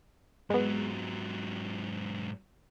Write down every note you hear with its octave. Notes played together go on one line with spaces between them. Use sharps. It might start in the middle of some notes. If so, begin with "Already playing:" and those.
G#2 F#3 G#3 B3